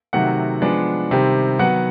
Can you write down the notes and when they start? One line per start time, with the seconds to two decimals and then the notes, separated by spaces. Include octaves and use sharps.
0.13 C3 D#3 F#3 A3 F#5
0.62 F3 G#3 B3 D4
1.11 C3 D#3 G3 C4
1.59 D#3 F#3 B3 F#5